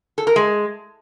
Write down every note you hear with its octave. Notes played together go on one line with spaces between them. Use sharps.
A4
A#4
G#3